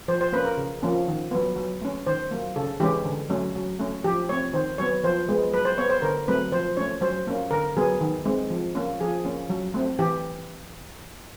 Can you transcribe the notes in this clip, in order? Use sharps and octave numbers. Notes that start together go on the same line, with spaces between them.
F3 C5
C5
A#3 C#4 B4
A#4
C#3
F3 A#3 C#4
D#3
F#3 B3
F#3
A3 C#4
D#3 C5
F#3 A#3
C#3 A4
E3 G#3 C#4 G4
D3
F#3 A3 C#4
F#3
A3 C#4
F3 G4
A3 C4 C#5
D#3 C5
F#3 B3 C#5
F3 C5
G#3 B3
F#3 B4
C5
B3 C#5
C5
D3 A#4
F#3 A3 C4 B4
F3 C5
A3 C#4 C#5
F#3 C5
A#3 C#4
D3 A#4
F#3 B3 G#4
D#3
G#3 C4
F3
A#3 C#4
F3 G#4
A#3 C#4
F#3
A3 C4
E3 G4